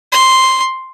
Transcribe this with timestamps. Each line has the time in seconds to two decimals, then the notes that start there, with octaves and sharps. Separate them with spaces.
0.12 C6